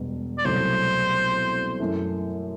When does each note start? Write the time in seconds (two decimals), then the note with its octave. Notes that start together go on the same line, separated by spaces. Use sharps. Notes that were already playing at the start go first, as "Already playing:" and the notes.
Already playing: E1 B2 G3
0.38 D5
0.45 C2 B2 F#3 A3 C5
1.80 F#2 E3 A3